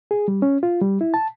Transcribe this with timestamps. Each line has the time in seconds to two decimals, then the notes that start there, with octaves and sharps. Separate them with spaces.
0.11 G#4
0.28 G3
0.42 C#4
0.63 F4
0.82 G3
1.01 E4
1.14 A5